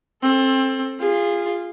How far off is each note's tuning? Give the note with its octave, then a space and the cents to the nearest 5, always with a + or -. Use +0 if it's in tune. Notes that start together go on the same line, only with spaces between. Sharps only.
C4 +25 A4 +0
F4 -5 G#4 -25